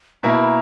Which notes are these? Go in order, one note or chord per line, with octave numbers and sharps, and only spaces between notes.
B2 A#3 E4 A#5
B5
A#5